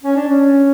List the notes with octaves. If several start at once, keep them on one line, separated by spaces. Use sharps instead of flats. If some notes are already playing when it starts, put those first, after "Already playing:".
C#4
D4
C#4